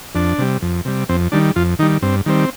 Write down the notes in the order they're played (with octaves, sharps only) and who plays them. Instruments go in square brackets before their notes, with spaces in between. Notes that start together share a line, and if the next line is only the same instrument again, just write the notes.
[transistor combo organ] F2 D4
C3 G3
F2
C3 G3
F2 C4
D#3 G3 D4
F2 F4
D#3 D#4
G3
G2 C4
D#3 G3 C4